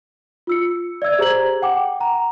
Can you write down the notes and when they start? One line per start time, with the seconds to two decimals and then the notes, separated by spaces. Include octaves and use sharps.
0.47 F4 E6 C#7
1.02 D5 E5 E6 G#6
1.18 G4 G#4 C5 A#5 G#6 F#7
1.62 F#5 G5 D6
2.00 F#5 A#5